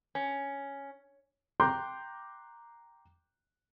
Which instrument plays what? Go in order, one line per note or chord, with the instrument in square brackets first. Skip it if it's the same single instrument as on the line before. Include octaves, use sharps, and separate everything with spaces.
[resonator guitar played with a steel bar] C#4
[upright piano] G5 A#5 C6 D6 F#6 G6